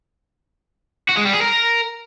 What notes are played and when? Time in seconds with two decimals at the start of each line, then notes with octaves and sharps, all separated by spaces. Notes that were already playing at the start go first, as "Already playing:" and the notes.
1.09 F#4
1.17 G#3
1.25 G3
1.34 G#4
1.42 A#4